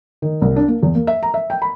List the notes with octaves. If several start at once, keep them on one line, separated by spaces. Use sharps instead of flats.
D#3
C2
D4
A#3
E2
A#3
E5
A#5
E5
G5
B5